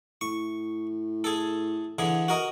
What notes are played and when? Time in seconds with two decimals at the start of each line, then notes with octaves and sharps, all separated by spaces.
0.21 A2 C#6
1.24 G#4 A4
1.99 D3 E3 G#4
2.28 F#4 A#4 D#5